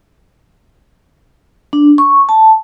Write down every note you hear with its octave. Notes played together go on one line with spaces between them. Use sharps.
D4
C#6
A5